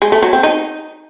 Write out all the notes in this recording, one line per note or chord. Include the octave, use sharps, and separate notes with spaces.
G#3
A3
F#3
C4
D#4